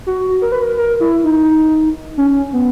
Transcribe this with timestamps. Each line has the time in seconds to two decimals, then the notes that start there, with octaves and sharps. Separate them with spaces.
0.06 F#4
0.42 A#4
0.52 B4
0.62 A#4
0.77 A#4
1.00 E4
1.24 D#4
2.18 C#4
2.53 B3